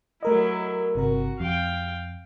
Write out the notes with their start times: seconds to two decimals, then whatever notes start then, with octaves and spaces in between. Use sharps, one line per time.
0.23 F#3 A3 E4 A#4 D#5
0.95 G1 C3 F#4 A#4
1.40 F2 F5 G5